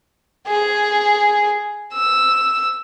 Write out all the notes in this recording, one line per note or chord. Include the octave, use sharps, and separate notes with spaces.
G#4
E6